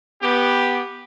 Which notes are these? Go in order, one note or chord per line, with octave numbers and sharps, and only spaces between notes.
B3 G4